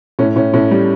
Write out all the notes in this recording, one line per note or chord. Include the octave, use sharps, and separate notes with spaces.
A2 C#4
A2 C#4
A2 C#4
G3